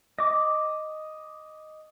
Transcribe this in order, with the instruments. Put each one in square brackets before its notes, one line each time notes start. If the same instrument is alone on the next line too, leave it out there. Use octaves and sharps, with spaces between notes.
[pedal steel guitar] D#5 D6